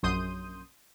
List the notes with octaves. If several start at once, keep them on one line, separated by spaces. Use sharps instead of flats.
A#1 F#2 C6 D#6 G6 D#7